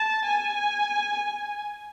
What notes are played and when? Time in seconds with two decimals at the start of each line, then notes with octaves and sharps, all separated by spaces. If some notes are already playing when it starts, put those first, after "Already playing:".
Already playing: A5
0.25 G#5